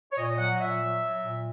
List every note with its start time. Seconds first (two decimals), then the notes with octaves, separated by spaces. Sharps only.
0.12 C#5
0.17 A#2 D#5
0.38 F#3 F#5
0.54 D#5
0.60 A#2 E5
0.81 F#3
1.03 F#3
1.24 A#2